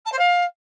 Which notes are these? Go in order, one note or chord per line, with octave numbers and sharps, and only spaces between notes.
A5
C5
F5